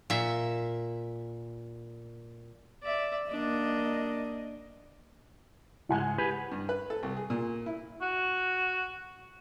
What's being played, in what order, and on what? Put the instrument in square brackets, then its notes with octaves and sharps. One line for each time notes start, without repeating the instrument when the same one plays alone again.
[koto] A#2 E5
[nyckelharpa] D5 E5
[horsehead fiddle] A#3 D#5 [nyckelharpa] D4
[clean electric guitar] C#2 G#2 G#3 [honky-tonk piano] E4 F#5 G#5
[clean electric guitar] G4 G#4 B4
[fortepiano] G2
B4
A4
C2
G#4
A#2
E4
[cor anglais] F#4